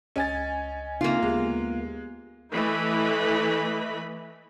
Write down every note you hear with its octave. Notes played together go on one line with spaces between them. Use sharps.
C#2 C#4 D#5 G#5 A6
C#3 A#3 C4 D#4 F4
D2 G#3 B3 G4
E3 A3 E4 B4 D#5 B5